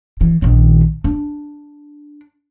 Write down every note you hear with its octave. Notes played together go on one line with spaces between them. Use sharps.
E3
A#1 D#3
D4